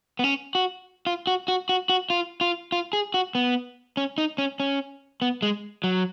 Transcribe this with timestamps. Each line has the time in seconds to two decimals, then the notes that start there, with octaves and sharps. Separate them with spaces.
0.19 B3
0.24 C#4
0.55 F#4
1.06 F4
1.27 F#4
1.48 F#4
1.69 F#4
1.89 F#4
2.10 F4
2.41 F4
2.72 F4
2.93 G#4
3.14 F#4
3.35 B3
3.97 C#4
4.18 D#4
4.38 C#4
4.60 C#4
5.22 B3
5.42 G#3
5.84 F#3